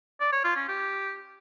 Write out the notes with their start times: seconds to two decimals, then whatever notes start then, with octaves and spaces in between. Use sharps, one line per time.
0.20 D5
0.32 C#5
0.44 F4
0.56 C#4
0.68 G4